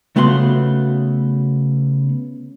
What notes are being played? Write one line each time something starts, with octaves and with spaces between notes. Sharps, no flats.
C#3 A3 B3 F#4 C6